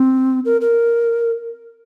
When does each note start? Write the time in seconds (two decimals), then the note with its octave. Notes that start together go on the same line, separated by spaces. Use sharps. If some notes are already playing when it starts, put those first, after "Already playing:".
Already playing: C4
0.45 A#4
0.61 A#4